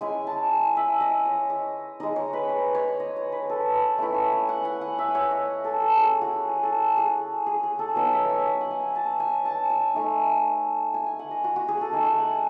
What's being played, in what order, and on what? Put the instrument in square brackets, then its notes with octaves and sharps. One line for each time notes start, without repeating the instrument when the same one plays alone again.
[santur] G#3 C#4 E4 G#5
A5
G#5
E5
D#5
C#5
D#5
G#3 D#4 D#5
C#5
B4
C#5
C#5
D#5
C#5
B4
A4
B4
A3 C#4 E4 C#5
G#5
G#5
F#5
G#5
F#5
E5
C#5
D#5
A4
A4
A3 C#4 E4 G#4
F#4
G#4
A4
G#4
G#4
G#4
A4
F#3 B3 D#4 C#5
E5
G#5
G#5
F#5
G#5
A5
G#5
A5
G#5
A3 D#4
G#5
G#5
F#5
D#5
F#4
F#4
G#4
A4
A3 D#4 G#5
G#5
F#5